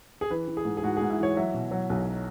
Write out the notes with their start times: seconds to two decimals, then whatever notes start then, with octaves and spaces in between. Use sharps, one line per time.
0.21 G#4
0.30 E3 B4
0.48 E3
0.57 G#4
0.65 G#2
0.77 G#4
0.83 G#2 F#4
0.97 G#4
1.01 G#2
1.10 E4
1.19 E3 C#5
1.37 F#3 E5
1.54 B2
1.71 F#3
1.90 B1